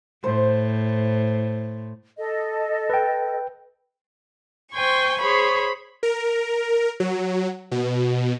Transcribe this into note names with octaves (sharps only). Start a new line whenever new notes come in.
A2 C5
A4 D#5
B4 G5
C5 G5 G#5 C6 C#6
G#4 C5 C#5 B5
A#4
F#3
B2